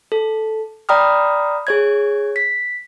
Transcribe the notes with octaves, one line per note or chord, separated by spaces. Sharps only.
A4
D5 G5 A#5 B5 D#6 F6
G#4 C#5 G#6
B6